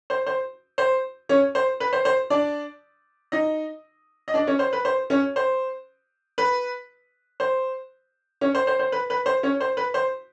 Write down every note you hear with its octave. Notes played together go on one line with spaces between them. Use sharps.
C5
C5
C5
C#4 C#5
C5
B4
C5
C5
D4 D5
D#4 D#5
D#5
D4 D5
C#4 C#5
C5
B4
C5
C#4 C#5
C5
B4
C5
C#4 C#5
C5
C5
C5
B4
B4
C5
C#4 C#5
C5
B4
C5